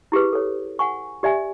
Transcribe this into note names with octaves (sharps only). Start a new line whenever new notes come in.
E4 G4 G#4 B4
A4 C#5
F#5 G#5 C#6
G4 D5 E5 G#5